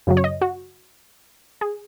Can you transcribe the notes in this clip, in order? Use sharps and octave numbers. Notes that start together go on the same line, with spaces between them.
F#2 C#3 F#3
C#5
D#5
F#4
G#4